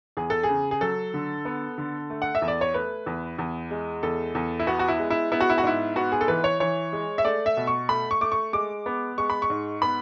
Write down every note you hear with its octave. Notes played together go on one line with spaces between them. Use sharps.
E2 G#4
A4
G#4
C#3
G#4
F#3 A4
D3
B3
D3
A3
F#5
E5
E2
D5
C#5
A3 B4
E2
E2
G#3
E2 A4
E2
E4
B3 F#4
F#4
E4
G#3
E4
B3 E4
F#4
E4
F#4
G#2 E4
B3 F#4
G#4
A4
E3 B4
C#5
E3 C#5
G#3
E5
A3 D5
E5
B2
C#6
A3 B5
C#6
A3 D6
C#6
G#3 D6
B3
G#3 C#6
B5
C#6
G#2
B3 B5